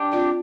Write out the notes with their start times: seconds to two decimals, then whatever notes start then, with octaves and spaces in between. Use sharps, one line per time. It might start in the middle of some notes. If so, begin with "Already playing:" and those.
Already playing: D4 G4
0.12 C4 F4 D5